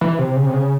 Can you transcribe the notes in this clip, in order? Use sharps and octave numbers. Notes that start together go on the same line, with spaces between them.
E3
C3
C#3
C3
C#3